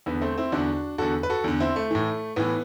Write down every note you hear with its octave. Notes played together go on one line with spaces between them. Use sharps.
E2 D3 B3
A3 C4
C4 E4
E2 D3 D4 F#4
E2 D3 F#4 A4
B4
F#4 A4
E2 D3
C4 E4
A3
A2 E3
A2 E3 B3